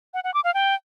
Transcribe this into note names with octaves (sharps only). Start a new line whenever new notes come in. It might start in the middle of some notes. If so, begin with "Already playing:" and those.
F#5
F#5
D6
F5
G5